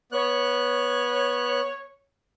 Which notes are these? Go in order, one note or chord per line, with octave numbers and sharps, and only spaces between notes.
B3 C#5 F#6